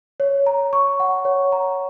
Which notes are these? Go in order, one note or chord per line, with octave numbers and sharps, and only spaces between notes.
C#5
A#5
C#6
F#5
C#5
A#5